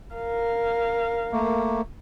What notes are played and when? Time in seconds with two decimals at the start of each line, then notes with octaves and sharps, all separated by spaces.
0.15 A#4 F5
1.32 A3 A#3